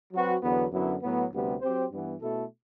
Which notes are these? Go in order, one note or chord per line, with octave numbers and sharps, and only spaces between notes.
F#3 C4 F#4 B4
E2 D3 F#3 B3
F#2 D3 F#3 B3 E4
A2 F#3 B3
D2 C3 G3 B3
F#3 C4 G4 C5
G2 E3 B3
B2 A3 E4 A4